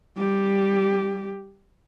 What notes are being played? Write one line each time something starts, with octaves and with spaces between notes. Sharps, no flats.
G3 G4